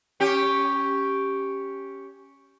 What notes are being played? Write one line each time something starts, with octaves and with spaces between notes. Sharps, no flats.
C#4 G4